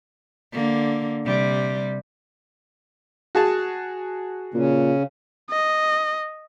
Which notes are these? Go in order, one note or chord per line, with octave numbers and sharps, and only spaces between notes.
D3 A#3
C3 G3
F#4 G#4 A5
A#2 C#3 C#4
D#5